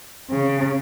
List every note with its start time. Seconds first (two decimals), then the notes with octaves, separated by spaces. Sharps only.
0.30 C#3